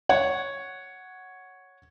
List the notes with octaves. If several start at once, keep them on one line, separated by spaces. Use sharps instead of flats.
C#5 F#5